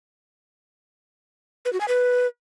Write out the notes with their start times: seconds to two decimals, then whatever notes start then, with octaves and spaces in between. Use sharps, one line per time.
1.65 B4
1.73 F#4
1.81 G#5
1.88 B4